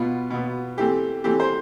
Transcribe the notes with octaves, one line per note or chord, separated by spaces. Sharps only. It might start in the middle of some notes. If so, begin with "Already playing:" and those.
Already playing: B2 B3 F4
B2 B3
E3 A3 C4 G4
E3 A3 C4 G4
C5